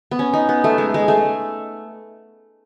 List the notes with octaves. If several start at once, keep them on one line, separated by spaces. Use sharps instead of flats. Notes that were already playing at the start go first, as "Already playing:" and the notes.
B3
C#4
D#4
B3
A3
G#3
G#3
A3